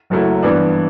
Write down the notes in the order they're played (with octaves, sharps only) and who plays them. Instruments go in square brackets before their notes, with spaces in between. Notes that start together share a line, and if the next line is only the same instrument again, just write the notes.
[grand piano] F#1 F#2 F#3 A3 E4
G2 E3 B3 D4